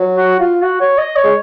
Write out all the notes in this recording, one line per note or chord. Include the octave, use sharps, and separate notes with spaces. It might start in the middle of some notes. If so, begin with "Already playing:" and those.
Already playing: F#3
F#4
F4
F#4
C#5
D#5
C#5
G#3